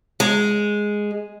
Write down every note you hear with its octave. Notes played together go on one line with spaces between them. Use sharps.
G#3